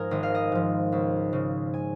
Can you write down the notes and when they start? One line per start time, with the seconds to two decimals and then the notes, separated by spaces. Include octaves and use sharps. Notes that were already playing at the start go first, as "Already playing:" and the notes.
Already playing: G#2 F3 G#4 A#4
0.11 G#1 D#5
0.23 F5
0.35 D#5
0.52 G#2 F3
0.92 C#2
1.33 C#3 F3
1.74 G#5